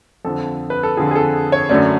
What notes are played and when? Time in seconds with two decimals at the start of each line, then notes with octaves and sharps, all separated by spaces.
0.25 F2 D3 F3 A4
0.70 B4
0.83 A4
0.97 F2 D3 F3 G#4
1.11 G#4
1.15 A4
1.52 C#5
1.69 F#2 D3 F#3 A3 C#4 D5